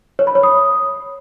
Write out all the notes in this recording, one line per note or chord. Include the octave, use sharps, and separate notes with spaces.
C#5
B5
C#5
D#6